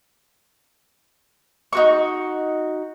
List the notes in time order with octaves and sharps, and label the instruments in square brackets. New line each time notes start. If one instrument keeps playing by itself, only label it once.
[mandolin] D#4 F#4 C#6